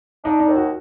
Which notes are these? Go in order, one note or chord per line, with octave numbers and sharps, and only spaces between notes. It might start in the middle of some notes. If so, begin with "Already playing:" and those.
D4 D#4
D#4
D#2
F#4